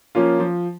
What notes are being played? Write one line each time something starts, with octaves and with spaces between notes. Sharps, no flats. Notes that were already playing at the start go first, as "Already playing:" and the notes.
F3 A#3 C#4 F4
F3